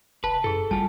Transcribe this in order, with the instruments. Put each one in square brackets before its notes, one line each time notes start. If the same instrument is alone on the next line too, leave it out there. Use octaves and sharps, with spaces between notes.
[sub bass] F1 [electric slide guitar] B4 [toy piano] A5
[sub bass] F#2 [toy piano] E4 G#4 [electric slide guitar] A4
[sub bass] G1 [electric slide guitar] G3 F4 [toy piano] G#5 A5